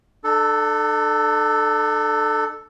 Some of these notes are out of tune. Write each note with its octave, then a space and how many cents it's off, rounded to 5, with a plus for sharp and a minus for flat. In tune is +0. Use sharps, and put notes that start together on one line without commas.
D4 +40 A4 +0